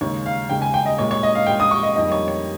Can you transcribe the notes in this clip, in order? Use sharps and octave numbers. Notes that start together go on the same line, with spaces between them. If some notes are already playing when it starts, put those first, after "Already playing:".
D#2 C#3 G#3 C#5
F5
D#2 C#3 G#3 G5
G#5
G5
D#5
A#2 G#3 C#5
C#5
D#5
F5
A#2 G#3 G5
D#6
C#6
D#5
F2 D#3 G3 A#3 D#5
C#5
C#5